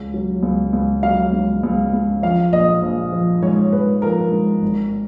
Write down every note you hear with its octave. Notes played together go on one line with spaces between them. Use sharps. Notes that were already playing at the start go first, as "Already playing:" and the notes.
Already playing: C#2
F#3
C#2
C#2
F#3 F5
C#2
C#2
C#2
F3 F5
A#1 D#5
A#1
F3
G#2 C#5
G#2 B4
F3 A#4
G#2
G#1